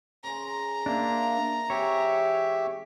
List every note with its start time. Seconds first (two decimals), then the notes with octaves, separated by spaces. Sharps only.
0.24 C#3 A#5 C6
0.86 A#3 D4 E5 C6
1.70 C3 E3 G#3 G4 C#5 E5